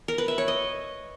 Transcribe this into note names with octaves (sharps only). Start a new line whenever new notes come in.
A#4
B4
E5
C#5
D#5